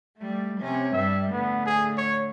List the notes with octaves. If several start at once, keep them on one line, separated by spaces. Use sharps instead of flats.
G3 A3
C3 C#4
G2 G3 E5
A2 D3 B3
G#4
C#5